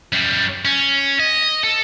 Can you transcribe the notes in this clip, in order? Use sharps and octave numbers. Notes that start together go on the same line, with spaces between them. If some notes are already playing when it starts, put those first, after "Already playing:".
F#2 G3
C#4
D#5
A4